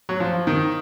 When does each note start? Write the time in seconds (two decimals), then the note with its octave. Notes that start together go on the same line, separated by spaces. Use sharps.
0.09 F#3
0.20 F3
0.47 D#3